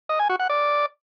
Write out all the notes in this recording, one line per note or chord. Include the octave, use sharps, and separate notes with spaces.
D#5
G#5
F#4
F#5
D5